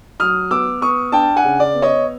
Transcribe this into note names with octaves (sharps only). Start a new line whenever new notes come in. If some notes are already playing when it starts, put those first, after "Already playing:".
F#3 D#6 F6
B3 D6 E6
B3 C#6 D#6
D4 G5 A5
F#5 G#5
C#3
D5
B3
C#5 D#5